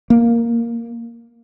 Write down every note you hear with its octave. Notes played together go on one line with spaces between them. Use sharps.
A#3